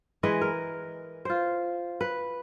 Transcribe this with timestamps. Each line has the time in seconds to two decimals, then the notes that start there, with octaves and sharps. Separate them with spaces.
0.23 E3 G#3 B4 D#5
0.41 A#4
1.25 F4 C5
2.01 B4